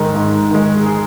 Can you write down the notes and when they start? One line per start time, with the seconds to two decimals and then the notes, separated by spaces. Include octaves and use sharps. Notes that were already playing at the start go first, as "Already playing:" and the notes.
Already playing: G#2 D#3 G#3
0.15 G#2
0.51 D#3 G#3
0.86 G#4